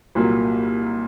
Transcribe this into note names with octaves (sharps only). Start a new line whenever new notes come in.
C2 A#2 F#3 A#3